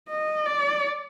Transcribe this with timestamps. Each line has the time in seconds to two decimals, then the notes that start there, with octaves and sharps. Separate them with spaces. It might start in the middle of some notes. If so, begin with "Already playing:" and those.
0.09 D#5
0.46 D5